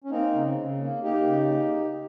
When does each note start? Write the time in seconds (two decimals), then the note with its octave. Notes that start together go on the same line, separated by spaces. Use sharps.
0.04 C#4
0.11 A#3 C4 D#4
0.34 C#3
0.57 C#3
0.80 A#3
1.03 A#3 D#4 G4
1.26 C#3
1.50 A#3